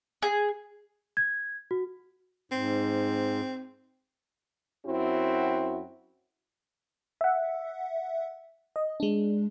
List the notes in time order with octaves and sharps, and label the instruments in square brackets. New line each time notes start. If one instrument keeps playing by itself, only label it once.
[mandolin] G#4
[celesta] G#6
F#4
[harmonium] G#2 [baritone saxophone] C4
[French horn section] F#2 C4 E4 F#4
[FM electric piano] E5 F#5
D#5
G#3 D4